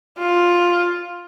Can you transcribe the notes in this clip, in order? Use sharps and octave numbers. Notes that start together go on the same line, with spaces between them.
F4